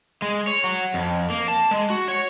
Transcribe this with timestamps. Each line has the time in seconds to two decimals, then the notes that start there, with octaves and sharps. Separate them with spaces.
0.22 G#3
0.47 C#5
0.64 F#3
0.94 F2
1.30 A#3
1.48 A5
1.71 G#3
1.90 F#4
2.08 C#5